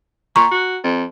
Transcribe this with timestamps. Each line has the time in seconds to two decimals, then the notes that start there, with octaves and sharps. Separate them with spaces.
0.36 A#2 A#5 C#6
0.51 F#4
0.84 F2